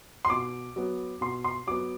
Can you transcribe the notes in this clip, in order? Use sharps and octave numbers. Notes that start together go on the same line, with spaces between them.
C6
B2 D6
F#3 B3
B2 C6
C6
F#3 B3 D6